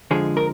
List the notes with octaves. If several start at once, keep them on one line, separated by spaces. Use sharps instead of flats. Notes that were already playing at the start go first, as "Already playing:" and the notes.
F2 D3 F3 G#3 G#4
A#4